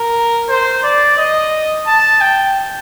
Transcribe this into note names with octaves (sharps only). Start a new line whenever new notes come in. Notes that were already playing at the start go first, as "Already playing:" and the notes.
Already playing: A#4
C5
D5
D#5
A5
G5